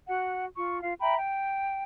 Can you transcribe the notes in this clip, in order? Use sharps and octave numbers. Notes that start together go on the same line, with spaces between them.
F#4 F#5
F4 C#6
F4 F5
E5 G5 A#5 B5
G5